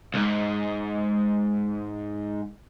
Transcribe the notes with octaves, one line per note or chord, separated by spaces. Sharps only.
C2 G#2